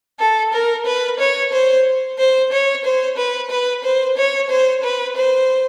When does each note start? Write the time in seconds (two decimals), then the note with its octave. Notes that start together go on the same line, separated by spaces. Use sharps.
0.19 A4
0.53 A#4
0.86 B4
1.20 C#5
1.52 C5
2.19 C5
2.52 C#5
2.85 C5
3.17 B4
3.50 B4
3.84 C5
4.17 C#5
4.50 C5
4.83 B4
5.16 C5